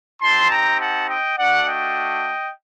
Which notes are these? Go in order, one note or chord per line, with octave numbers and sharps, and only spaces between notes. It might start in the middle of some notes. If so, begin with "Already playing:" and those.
C4 D#4 G4 A5 C6
G5 A#5
F#5 A5
D#5 G5
A3 D4 F#4 D5 F#5
D#5 G5